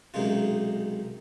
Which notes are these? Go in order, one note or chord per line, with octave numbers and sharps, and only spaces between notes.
B1 C3 D#3 G#3 C#4 F4